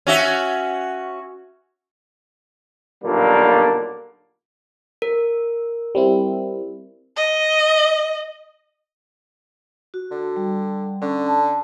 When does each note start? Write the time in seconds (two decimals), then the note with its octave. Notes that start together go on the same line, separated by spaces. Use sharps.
0.07 C#4 F#4 E5
3.04 B1 A#2 D3 G3 A#3
5.02 A#4
5.95 G3 C4 E4
7.16 D#5
9.94 F#4
10.11 D3
10.36 G3
11.02 D3 C#4
11.27 A5